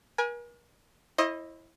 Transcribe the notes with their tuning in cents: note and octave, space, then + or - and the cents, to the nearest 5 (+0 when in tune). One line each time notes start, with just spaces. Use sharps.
A#4 +45 G#5 +0
E4 +0 C5 +45 D#5 +0